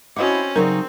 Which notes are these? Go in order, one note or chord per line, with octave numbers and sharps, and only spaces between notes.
C4 C#4 E4 F#4 D#5 F#5 D6
C#3 F#3 C4 D#4 A#4 D5